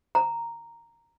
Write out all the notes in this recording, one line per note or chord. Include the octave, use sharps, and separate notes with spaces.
A#5